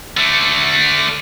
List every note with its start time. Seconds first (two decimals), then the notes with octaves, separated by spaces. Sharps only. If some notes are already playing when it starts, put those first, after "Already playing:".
0.17 D3 A3